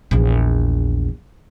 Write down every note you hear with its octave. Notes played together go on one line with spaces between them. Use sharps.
A#1 E2